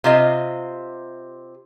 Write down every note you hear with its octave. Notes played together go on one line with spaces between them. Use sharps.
C3 F4 D#5